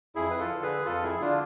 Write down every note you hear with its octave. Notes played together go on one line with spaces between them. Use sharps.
F2 E4 G#4
B4
F4 A4
D3
G#4 B4
F2 F4 A4
E4 G#4
D3 D4 F4